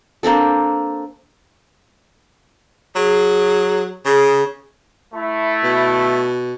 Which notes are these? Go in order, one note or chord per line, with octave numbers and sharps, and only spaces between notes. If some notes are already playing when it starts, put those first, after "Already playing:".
A#3 C4 D4 A4
F#3 G#4
C#3 G#4
A3 E4
B2